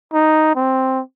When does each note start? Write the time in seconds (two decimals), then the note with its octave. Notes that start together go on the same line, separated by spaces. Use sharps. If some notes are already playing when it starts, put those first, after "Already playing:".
0.13 D#4
0.55 C4